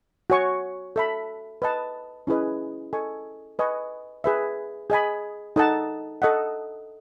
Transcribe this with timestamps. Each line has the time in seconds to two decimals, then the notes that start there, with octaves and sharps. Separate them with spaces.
0.30 F#4 C#5 G#5 C#6
0.96 A4 E5 B5
1.62 B4 D#5 A5
2.27 C#4 E4 G#4 B4 D#5
2.93 A4 D#5 G#5 C#6
3.59 B4 D#5 G#5 C#6
4.24 G#4 B4 E5
4.90 G#4 D#5 G#5 B5
5.56 D#4 A4 D#5 F#5 A5
6.22 A4 D#5 F#5